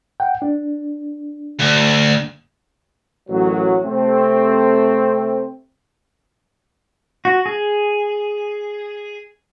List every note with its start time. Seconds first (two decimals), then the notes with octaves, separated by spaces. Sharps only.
0.20 F#5 G5
0.42 D4
1.60 D2
3.29 A1 F#2 F#3
3.83 C3 A3 C4
7.25 F#4
7.46 G#4